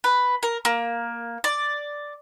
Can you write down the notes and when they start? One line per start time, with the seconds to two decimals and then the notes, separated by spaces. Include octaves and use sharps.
0.04 B4
0.43 A#4
0.65 A#3
1.44 D5